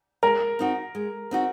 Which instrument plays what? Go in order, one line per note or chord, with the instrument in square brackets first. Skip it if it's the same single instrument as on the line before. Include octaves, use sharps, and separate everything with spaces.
[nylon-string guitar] G#3 [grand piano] A#4
[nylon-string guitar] C4 D#4 F#4
G#3
C4 D#4 F#4